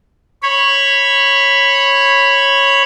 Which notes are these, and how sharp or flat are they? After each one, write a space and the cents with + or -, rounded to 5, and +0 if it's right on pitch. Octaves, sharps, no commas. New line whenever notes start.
C#5 -10 B5 +0